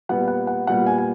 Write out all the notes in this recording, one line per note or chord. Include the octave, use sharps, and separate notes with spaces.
A#2 G3 B3 F#5
F#5
F#5
A#2 G3 B3 F#5
G#5
G#5